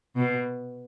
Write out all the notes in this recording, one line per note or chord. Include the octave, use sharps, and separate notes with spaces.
B2